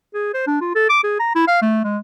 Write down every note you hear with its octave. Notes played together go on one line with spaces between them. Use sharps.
G#4
C5
D4
F4
A4
D6
G#4
A#5
E4
F5
A3
G#3